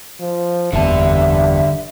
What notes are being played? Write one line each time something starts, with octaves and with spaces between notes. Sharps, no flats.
F3
F#1 E2 G2 D3 E5 A5